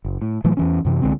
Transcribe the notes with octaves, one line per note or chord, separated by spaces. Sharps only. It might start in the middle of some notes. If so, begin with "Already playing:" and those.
F#1
A2
A2 E3 F#3 A3
E2 E3 C#4
F#2 C3 E3
C2 D3 G#3 C4